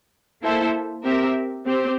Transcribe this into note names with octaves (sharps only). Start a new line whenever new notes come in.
A#3 E4 A4 C5 E5
C4 G4 A#4 E5
C4 G4 C5